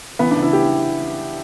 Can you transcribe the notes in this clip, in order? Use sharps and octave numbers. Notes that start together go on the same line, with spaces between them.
E3 B3
D4
C#2
E4
G4